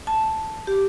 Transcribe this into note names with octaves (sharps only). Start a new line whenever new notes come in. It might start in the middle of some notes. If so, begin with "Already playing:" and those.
A5
G4